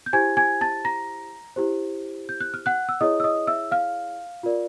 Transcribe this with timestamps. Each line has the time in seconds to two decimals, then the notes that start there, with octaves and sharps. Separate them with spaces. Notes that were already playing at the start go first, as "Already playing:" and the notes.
0.06 G6
0.13 E4 G4 C5 G#5 G#6
0.37 G#5 G#6
0.61 A5 A6
0.85 A#5 A#6
1.56 E4 G4 C5
2.29 G6
2.41 F#6
2.54 F6
2.66 F#5 F#6
2.89 E6
3.01 E4 G#4 C#5 D#5 D#6
3.20 E6
3.24 D#5 D#6
3.47 E5 E6
3.71 F5 F6
4.43 F4 A#4 D5